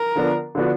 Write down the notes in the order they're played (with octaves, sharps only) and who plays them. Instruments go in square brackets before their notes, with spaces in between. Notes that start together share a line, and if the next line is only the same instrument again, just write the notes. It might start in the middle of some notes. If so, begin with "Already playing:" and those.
Already playing: [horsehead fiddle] A#4
[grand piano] D3 F3 B3 D4
D3 F3 B3 D4 F#4